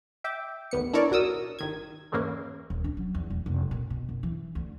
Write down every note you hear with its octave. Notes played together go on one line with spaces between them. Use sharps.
E5 G5 D6
A1 D#2 B3 C#7
D4 E4 A#4 C#5 D5
B1 F#4 A#4 D#6 E6
G1 D#3 G#6
E2 G#2 E3 A#3 C#4
D#1
D4
F#3
E2
E1
F1
A#2
B2
F#1
E3
D2